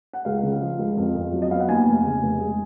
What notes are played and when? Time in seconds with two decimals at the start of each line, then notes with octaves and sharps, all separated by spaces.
0.13 F#5
0.25 C#2 F5
0.43 C#3
0.61 F3
0.79 C#2
0.97 F2
1.15 F2
1.32 F#3
1.42 D#5
1.51 B3 F5
1.60 F#5
1.69 D#2 G#5
1.86 F1
2.05 C#3
2.23 F1
2.40 G#3